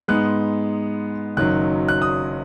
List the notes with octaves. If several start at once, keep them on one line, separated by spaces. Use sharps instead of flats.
G#2 G#3 B3 D#4 F#6
F#1 F#2 D#3 F#3 D#4 F#6
F#6
D#6